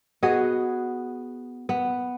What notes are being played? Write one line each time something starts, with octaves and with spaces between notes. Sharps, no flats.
B3 F#4 G#4 D#5
B3